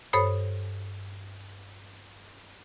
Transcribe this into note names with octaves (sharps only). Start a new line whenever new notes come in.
G2 A4 C5 C#5 B5 D#6